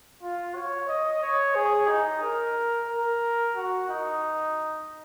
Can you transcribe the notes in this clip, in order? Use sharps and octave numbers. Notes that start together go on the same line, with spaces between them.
F4
C#5
D#5
C#5
G#4
D#4
A#4
A#4
F#4
D#4